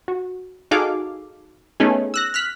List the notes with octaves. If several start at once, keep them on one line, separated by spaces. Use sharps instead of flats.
F#4
D#4 F#4 G#4 A4 F5 D6
A3 B3 C#4 D#4 G#4
E6 F#6 A#6
F6 F#6 B6